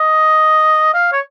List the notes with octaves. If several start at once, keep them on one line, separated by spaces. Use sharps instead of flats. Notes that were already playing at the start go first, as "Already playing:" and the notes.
Already playing: D#5
F5
C#5